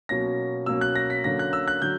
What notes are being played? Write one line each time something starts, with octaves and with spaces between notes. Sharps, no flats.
B2 F#3 A#3 C#4 A#6
B2 F#3 A#3 C#4 E6
F#6
A#6
B6
D3 F#3 A#3 C#4 A#6
F#6
E6
F#6
D3 F#3 G6